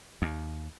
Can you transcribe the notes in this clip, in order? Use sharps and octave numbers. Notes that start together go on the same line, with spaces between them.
D#2